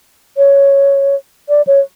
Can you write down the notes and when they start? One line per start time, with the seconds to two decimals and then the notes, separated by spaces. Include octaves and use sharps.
0.37 C#5
1.49 D5
1.67 C#5